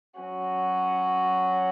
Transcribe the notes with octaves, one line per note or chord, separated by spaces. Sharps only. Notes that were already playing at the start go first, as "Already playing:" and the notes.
F#3 C#4 F#4